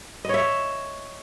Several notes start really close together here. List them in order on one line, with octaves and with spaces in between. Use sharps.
D#5 C#5 E5